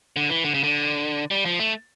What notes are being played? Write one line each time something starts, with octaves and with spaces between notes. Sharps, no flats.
D3
E3
D3
C#3
D3
G3
F3
A3